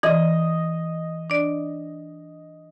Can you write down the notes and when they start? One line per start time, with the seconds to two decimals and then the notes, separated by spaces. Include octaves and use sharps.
0.03 E3 D#5
1.30 D4 D5